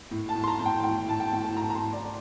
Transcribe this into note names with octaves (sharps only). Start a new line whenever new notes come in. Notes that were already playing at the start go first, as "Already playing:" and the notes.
A2
A5
A2
C6
A#5
A2
G5
A2 G5
A2 A5
G5
A2 G5
A5
A2 A#5
A#5
C6
A2
D5